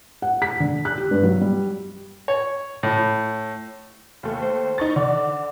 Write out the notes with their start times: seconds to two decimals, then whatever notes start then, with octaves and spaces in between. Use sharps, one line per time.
0.22 F#5
0.42 B6
0.60 D3
0.85 F#6
0.98 G4
1.11 G2
1.23 F#3
1.41 G3
2.28 C#5
2.83 A2
4.23 D#2 A3
4.41 C5
4.78 D#4 C#6 A6
4.96 D3 D5